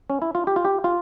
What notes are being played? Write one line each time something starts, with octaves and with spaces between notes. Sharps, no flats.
C#4
E4
F4
G4
F4
G4
F4